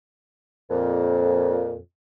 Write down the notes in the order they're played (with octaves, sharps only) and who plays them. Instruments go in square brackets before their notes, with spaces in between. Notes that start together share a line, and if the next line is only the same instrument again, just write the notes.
[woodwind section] F2 A#2